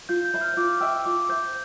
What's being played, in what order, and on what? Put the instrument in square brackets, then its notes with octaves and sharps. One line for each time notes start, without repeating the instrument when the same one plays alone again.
[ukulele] F4 [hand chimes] G6
[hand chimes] G6
[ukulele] C5 E5 B5
[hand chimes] F6
[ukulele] F4 [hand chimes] D6
[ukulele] B4 E5 G5 [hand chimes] E6
[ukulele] F4 [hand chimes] D6
[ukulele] C5 E5 [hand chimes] G6